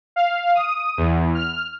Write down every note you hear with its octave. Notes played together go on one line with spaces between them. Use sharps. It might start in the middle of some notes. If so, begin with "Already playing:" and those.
F5
D#6
E2
F6